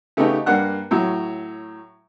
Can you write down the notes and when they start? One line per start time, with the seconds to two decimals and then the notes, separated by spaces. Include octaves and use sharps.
0.17 C#3 A3 B3 D#4 G4
0.46 G2 A#3 D4 F#5 F#6
0.91 A2 F#3